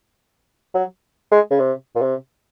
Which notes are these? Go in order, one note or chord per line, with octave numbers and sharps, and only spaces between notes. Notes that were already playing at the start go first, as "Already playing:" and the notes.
F#3
G#3
C#3
C3
A#2
C3